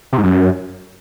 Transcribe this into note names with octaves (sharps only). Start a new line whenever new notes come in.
C3
G#2
F#2